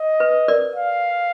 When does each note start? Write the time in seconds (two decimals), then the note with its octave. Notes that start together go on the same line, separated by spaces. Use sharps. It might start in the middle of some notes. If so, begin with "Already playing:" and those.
Already playing: D#5
0.20 B4
0.48 A#4 D5
0.76 F5